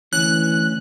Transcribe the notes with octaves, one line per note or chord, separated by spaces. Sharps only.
D2 E3 C#4 F#6